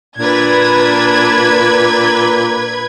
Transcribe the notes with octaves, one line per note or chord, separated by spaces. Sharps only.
A#2 D4 B4 G#6